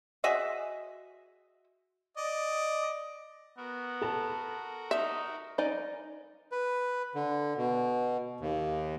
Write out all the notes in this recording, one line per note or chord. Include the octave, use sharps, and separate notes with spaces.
F#4 G#4 D#5 E5
D5 D#5
B3 F#4 A#4
A4 A5
D#4 E5
D#4 D5 D#5 G#5
B4
D3
B2
D#2